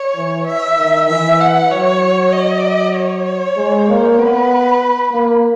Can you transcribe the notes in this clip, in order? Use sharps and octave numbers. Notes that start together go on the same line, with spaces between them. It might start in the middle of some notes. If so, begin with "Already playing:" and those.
Already playing: C#5
E3
E5
D#3
E3 E5
F#5
F#3 C#5
D#5
C#5
G#3
A#3
B3 B4
A#3